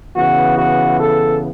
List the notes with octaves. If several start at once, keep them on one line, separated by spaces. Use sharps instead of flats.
C#3 E3 B3 F#4
F#4
A4